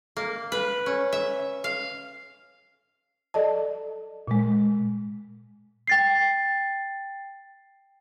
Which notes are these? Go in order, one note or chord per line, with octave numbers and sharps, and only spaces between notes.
A#3
B4
C#4
E5
F5
A4 D5 D#5 A5
A#2 G#3
G5 A6 C7